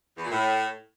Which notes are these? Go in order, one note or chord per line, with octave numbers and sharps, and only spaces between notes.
E2
A#2
A2